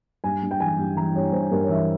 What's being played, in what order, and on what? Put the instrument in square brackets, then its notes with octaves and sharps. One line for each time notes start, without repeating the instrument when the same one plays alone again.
[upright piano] G2 G#5
G2
G5
E3 G#5
G2
E3 A#5
G2 C#5
G2 C5
G2 A#4
C#5
E3 E5